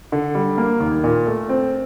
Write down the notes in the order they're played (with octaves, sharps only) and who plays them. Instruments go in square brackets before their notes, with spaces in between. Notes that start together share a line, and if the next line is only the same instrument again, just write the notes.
[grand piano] D3
G3
A#3
D#2
A#2
A3
C4